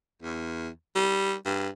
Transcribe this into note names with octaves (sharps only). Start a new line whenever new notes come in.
E2
G3
G2